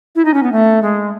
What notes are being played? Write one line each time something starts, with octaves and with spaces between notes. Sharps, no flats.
E4
D#4
C#4
B3
A3
G#3